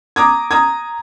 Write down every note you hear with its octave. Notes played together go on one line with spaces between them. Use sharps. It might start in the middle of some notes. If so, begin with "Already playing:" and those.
A#5 D6 D#6 G#6
A#5 D#6 G#6